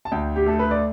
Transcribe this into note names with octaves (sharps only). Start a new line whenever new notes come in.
A5
D2 G5
G4
A3 A4
B4
D5